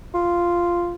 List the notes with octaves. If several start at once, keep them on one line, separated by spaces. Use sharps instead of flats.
F4